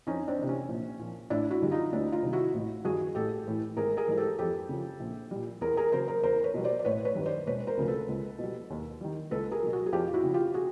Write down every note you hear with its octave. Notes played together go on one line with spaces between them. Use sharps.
F2 C#4 D#4
C4 D4
C3 E3
C#4
A#1
A#2 F3
A1 D4 E4
E4 F#4
G2 D3 G3
D#4 F4
D2 D4 E4
D#4 F4
C3 D#3 G3
E4 F#4
A1
G2 D#3 G3 F#4 G#4
A1 G4 A4
A2 E3
G#1 G#4 A#4
G#4 A#4
G#2 E3 G3
G4 A4
F2 G4 A4
C#3 F3
A#1
A#2 G3
E2 G#4 A#4
G#4 A#4
C#3 F#3 A#4 C5
A#4 C5
E2 A#4 C5
B4 C#5
B2 G3
C5 D5
D5
A1 B4 C#5
B4 C#5
G2 D#3 G3
C5 D5
E1 B4 C#5
A#4 C5
D2 C#3 F3
A4 B4
C#2
B2 G3
D#2
D#3 G3
C#2 A4 B4
G#4 A#4
B2 F#3
F#4 G#4
G#4
F2 F4 G4
F4
E4 F#4
C#3 F3
F4 G4
F#4 G#4